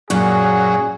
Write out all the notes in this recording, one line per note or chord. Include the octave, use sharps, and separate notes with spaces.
F#2 A#2 F#3 C#4 G#4